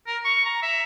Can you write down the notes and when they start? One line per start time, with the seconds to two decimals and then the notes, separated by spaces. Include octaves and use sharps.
0.07 A#4
0.25 C#6
0.45 A#5
0.62 E5